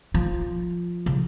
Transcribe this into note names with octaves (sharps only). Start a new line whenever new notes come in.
F3
C#3